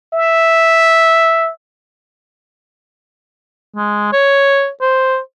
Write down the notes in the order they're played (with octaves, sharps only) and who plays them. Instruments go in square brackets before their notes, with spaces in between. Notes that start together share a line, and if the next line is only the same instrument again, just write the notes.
[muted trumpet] E5
[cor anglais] G#3
C#5
C5